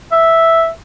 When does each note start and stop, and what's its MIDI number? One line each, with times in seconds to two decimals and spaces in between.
0.12 0.68 76